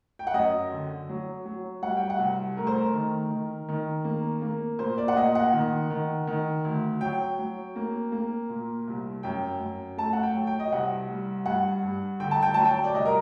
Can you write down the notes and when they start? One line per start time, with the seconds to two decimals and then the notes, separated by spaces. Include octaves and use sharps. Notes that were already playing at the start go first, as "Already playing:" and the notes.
0.19 G5
0.27 F#5
0.34 F#2 D#5
0.72 D3
1.09 F#3
1.45 F#3
1.82 G3 F#5
1.97 G5
2.10 F#5
2.19 C2
2.57 A3 A#4
2.67 C5
2.78 A#4
2.93 D#3
3.30 D#3
3.69 D#3
4.05 A#3
4.42 A#3
4.79 A#2 C5
4.98 D5
5.08 F#5
5.17 A#2 D#5
5.35 F#5
5.53 D#3
5.90 D#3
6.27 D#3
6.65 D2
7.01 F#3 G5
7.39 F#3
7.76 A#3
8.12 A#3
8.50 A#2
8.87 C2
9.23 F#2 G5
9.60 F#2
9.97 A3 A5
10.13 F#5
10.23 G5
10.35 F#3
10.47 G5
10.60 D#5
10.72 C2 F#5
11.09 G3
11.46 G2 F#5
11.83 G2
12.20 D3 G5
12.31 A5
12.42 G5
12.54 F#3 A5
12.65 G5
12.84 D5
12.94 C2 D#5
13.05 A#4